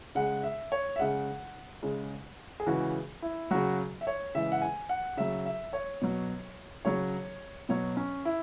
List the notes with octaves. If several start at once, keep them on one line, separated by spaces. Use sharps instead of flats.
C#3 G#3 F#5
E5
C#5
E5
C#3 G#3 F#5
C#3 G#3
G#4
C#3 E3 G#3 F#4
E4
C#3 F#3 F#4
E5
C#5
C#3 E3 G#3 E5
F#5
G#5
F#5
C#3 F#3 E5
E5
C#5
B2 F#3
C#3 F#3 C#5
B2 F#3 C#5
C#4
E4